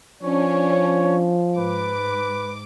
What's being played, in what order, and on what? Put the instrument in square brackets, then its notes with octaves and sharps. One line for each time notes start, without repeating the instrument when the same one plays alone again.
[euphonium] F3 [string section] C#4 D4 [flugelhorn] C#5
[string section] G#2 D6 [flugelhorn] B4